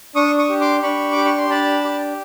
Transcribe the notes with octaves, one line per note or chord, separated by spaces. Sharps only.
D4 C#6 D#6
C#6 D#6
G4
C6 D6
D4 B5 C#6
G4 D6
C#6
C6
D4 A5 B5
G4